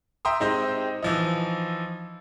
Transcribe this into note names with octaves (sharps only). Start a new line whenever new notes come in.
E5 G5 A#5 C6 D#6
G#3 C4 D#4 G4 C5
E3 F3 D#4